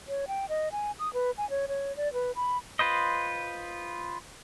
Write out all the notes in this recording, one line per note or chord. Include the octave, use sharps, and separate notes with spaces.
C#5
G5
D#5
G#5
D#6
B4
G#5
C#5
C#5
D5
B4
B5
F4 B4 C5 D#5